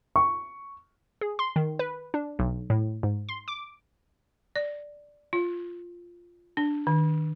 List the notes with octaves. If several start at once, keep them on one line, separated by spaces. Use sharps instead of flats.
C#6
G#4
C6
D#3
B4
D4
B1
A2
G#2
C6
D6
D5
F4
D4
D#3